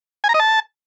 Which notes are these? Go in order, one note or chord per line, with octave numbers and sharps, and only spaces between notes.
G#5
A#5
D#5
A5